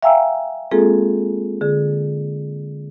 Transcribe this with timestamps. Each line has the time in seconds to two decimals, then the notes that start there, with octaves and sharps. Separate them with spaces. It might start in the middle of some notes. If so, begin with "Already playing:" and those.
0.03 E5 F5 G5 G#5 A#5 E6
0.71 G#3 A#3 C4 F4 G#4 A4
1.61 D3 G#4